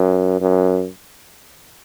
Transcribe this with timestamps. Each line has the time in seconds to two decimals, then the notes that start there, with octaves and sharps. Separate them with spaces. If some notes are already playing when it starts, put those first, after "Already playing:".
Already playing: F#2
0.40 F#2